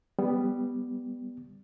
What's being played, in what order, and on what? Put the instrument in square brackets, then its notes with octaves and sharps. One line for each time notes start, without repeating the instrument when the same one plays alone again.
[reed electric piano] G3 B3